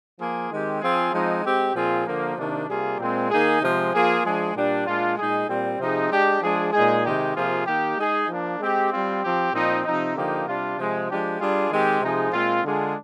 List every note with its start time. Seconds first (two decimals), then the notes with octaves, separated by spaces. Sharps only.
0.20 F3 A#3 F4 G#4
0.52 D#3 G#3 C4 G4
0.82 F3 C4 F4 G#4
1.13 F3 G#3 C4 D#4
1.45 G#3 C4 G4
1.75 A#2 F3 C4 F4 G#4
2.07 D3 F3 A#3
2.38 C3 D#3 A#3 D4
2.69 C3 G3 A#3 F4 G#4
2.99 A#2 G#3 C4
3.30 D#3 A#3 D#4 G#4
3.62 C3 F3 G#3
3.93 F3 A#3 F4 G#4
4.25 F3 G#3 D4 G#4
4.56 A#2 G3 D4
4.87 A#2 G#3 D4 F4
5.17 A#2 G#3 D#4 G#4
5.49 A#2 G3 C4
5.79 C3 F3 C4 D#4 G#4
6.11 G#3 D4 G4
6.42 F3 G#3 D4 G#4
6.73 A#2 G#3 D#4 G#4
7.05 C3 D#3 G#3 D#4 G4
7.35 C3 F3 A#3 F4 G#4
7.66 D#3 A#3 D#4 G4
7.97 G#3 D#4 G#4
8.28 F3 A#3 D4
8.60 G#3 C4 G4
8.91 G3 C4 F4
9.22 F3 C4 G4
9.54 A#2 F3 C4 D#4
9.84 C3 F3 C4 D#4
10.16 D3 F3 A#3 D#4 G4
10.46 C3 G3 D4 F4
10.78 C3 F3 G#3
11.09 F3 G#3 D4 G4
11.40 G3 D4 F4 G#4
11.71 D#3 G#3 C4 G4
12.02 C3 F3 G#3 D#4 G#4
12.33 A#2 G#3 C4 F4
12.64 D3 G#3 D4 F4 G#4